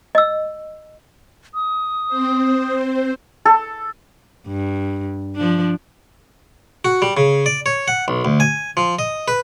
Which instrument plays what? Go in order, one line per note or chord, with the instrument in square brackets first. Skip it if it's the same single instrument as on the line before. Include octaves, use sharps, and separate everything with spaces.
[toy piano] D#5 E6
[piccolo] D#6
[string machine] C4 C5
[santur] A4
[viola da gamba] G2
F3 D4
[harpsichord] F#4
G3
C#3
D5
C#5
F#5
B1
D2
G#5
F3
D#5
B4